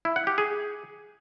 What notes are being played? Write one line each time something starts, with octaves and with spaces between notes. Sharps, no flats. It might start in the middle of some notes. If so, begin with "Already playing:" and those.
E4
F#5
G4
G#4